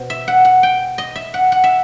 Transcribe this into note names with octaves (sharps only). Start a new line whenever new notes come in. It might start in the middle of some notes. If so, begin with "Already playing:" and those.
Already playing: B2 C5
E5
F#5
F#5
G5
D#5
E5
F#5
F#5
E5